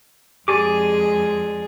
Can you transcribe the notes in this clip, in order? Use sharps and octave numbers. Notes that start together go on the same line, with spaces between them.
F2 G#3 G4 G#4 D5 G#5 D6